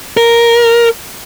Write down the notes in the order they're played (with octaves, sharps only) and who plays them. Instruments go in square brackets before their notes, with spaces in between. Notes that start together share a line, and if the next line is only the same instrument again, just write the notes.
[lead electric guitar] A#4